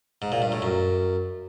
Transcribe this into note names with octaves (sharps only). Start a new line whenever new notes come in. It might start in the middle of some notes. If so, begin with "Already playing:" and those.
G#2
A#2
G2
A2
F#2